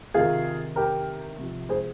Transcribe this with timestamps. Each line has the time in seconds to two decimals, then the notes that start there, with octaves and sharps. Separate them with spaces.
0.14 C3 D#3 F4 G#4
0.76 G4 A#4
1.38 C3 F3
1.69 G#4 C5